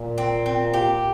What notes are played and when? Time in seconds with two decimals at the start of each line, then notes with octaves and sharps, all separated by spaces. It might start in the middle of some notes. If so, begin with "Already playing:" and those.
Already playing: A#2
0.18 C4
0.46 C4
0.74 G4